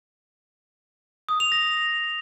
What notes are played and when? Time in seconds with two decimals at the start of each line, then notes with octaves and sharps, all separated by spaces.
1.29 D#6
1.40 F7
1.52 A#6